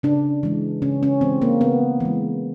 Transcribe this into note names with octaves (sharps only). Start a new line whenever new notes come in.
C#3 D4
E3 G#3
C#3 C#4
C#4
E3 G#3 C4
A#3
C#3 B3
E3 G#3